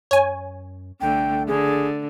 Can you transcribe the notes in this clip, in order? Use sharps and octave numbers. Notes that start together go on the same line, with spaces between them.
F#2 C#5 G#5
C2 D3 A3 G5
F#1 D3 G#4